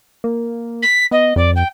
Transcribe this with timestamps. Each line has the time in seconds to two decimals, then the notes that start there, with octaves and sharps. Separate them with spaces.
0.24 A#3
0.82 B6
1.11 B3 D#5
1.36 F2 D5
1.55 G5